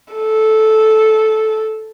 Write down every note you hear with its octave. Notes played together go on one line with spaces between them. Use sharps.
A4